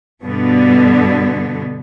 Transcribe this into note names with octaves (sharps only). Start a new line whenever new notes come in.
G2 B2 D3 B3